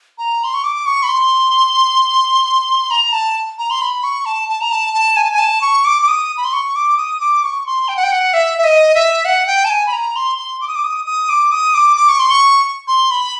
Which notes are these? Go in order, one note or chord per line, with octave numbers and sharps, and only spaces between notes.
A#5
C6
C#6
D6
C#6
B5
C6
A#5
A5
A#5
C6
B5
C#6
A5
A5
A#5
A5
A5
G#5
A5
G#5
A5
C#6
D6
D6
D#6
B5
C6
C#6
D6
D#6
D6
C#6
C6
G5
F#5
G5
F#5
E5
E5
D#5
E5
F#5
G5
A5
G#5
B5
A#5
C6
C6
D6
D#6
D6
D#6
D#6
D6
D#6
D6
D6
C#6
C6
C#6
C6
B5